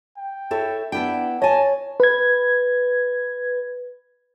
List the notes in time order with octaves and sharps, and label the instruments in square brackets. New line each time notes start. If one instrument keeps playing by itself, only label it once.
[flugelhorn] G5
[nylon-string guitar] E4 A4 C#5
[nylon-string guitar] B3 E4 G5 [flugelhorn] D4
[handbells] C#5 [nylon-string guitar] D#5 G#5 [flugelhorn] A5
[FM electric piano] B4 G#6